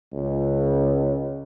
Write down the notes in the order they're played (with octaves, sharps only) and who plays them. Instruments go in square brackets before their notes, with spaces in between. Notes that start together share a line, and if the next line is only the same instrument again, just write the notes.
[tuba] C#2